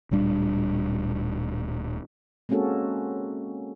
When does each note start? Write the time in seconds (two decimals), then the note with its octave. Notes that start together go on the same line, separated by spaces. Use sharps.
0.11 D1 A#2 G3 D4
2.49 G#3 A#3 C4 C#4 F#4 A4